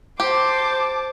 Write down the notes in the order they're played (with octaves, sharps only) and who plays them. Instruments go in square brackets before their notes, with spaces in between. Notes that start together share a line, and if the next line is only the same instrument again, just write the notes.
[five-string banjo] G4 [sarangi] C5 [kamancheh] A5 D6